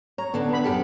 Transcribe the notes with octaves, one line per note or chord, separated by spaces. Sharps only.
C#5 A#5
D3 B3 D4
B3 B5
F#2 G4 A4